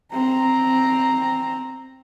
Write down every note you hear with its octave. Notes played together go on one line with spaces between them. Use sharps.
C4 A#5